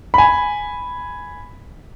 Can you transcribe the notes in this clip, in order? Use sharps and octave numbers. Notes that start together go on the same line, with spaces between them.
G#5 B5